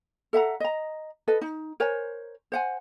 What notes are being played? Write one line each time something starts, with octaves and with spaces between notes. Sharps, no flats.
A4 E5 F#5 A#5
D#5 A#5
A4 B4 D#5
D#4
A#4 C5 C#5 G#5
C5 F#5 G#5